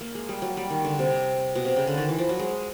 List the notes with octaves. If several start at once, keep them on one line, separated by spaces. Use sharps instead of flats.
A#3
G#3
G3
F#3
G3
D#3
D3
C3
B2
C3
C#3
D3
D#3
E3
F3
F#3
G#3